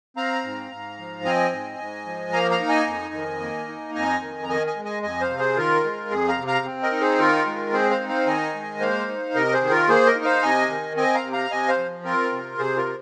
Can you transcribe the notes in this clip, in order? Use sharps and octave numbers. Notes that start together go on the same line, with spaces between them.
C4 F5 A#5
G#2
G#2
F3
C4 D#5 G#5
G#2
G#2
F3
A#3 F5 A#5
F5 A#5
D#4
D#5 G#5
F2
D#3
A#3
D#4
F2 D#5 G#5
D#3
A#5
D#3 D#5 G#5
D#5 G#5
G#3
D#5 G#5
F2 D#5 G#5
C5 F5
C3
G#4 C5
D#3 F4 A#4
G#3
F2 G#4
F5 A#5
C3
F5 A#5
C4
A#4 D#5
D#4
G#4 C5
D#3 F4 A#4
G#3
C4 G#4 C5
C5 F5
D#4
C5 F5
D#3 D#5 G#5
G#3
A#3 C5 F5
D#4
C3 A#4 D#5
G#4 C5
D#3
F4 A#4
A#3 G#4 C5
A#4 D#5
D#4
C5 F5
C3 D#5 G#5
D#3
C4 D#5 G#5
F5 A#5
C3
F5 A#5
C3 D#5 G#5
C5 F5
F3
C4 F4 A#4
C3
C3 G#4 C5
F4 A#4
F3